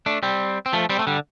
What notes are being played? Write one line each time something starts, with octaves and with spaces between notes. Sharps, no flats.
A3 D4
G3 C4
C4
F3 A3
G3 C4
A3
D3 G3